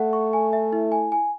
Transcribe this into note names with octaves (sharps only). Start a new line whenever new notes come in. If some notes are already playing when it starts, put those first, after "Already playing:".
Already playing: A3 F#5
C#6
G#5
E5
E4
G#5
G#5